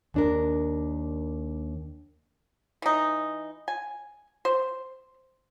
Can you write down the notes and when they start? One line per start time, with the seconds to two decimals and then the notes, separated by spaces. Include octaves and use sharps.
0.14 D#2 D4 A#4
2.82 E3 D#4
3.68 G#5
4.45 C5